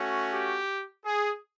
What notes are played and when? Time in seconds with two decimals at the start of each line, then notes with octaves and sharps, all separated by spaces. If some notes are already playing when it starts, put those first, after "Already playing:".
Already playing: A3 C#4 F#4
0.32 G4
1.05 G#4